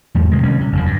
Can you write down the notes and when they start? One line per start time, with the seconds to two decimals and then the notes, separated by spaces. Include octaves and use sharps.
0.15 E2 G#2
0.32 C3 D#3 G#3
0.43 C3 G3 C#4
0.60 C3
0.72 F#1 E2 D3
0.86 G2